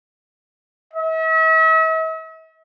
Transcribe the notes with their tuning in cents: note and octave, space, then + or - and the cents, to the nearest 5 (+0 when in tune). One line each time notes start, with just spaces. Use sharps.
E5 -45